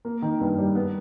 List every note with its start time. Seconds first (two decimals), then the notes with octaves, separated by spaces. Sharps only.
0.05 A#3
0.22 D#3
0.41 G2
0.58 G3
0.75 B3